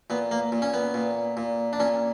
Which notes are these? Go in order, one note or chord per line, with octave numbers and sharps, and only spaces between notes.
A#2 B3
A#3
A#2
C#4
B3
A#2
A#2
D4
A#2 C#4